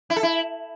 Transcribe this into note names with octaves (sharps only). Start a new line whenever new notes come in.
E4
A4
E4